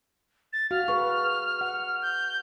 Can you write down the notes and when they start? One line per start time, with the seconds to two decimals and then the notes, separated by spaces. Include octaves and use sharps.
0.53 A6
0.71 F#4 F5 F6
0.88 G#4 B4 C#6
1.61 F#5
2.02 G6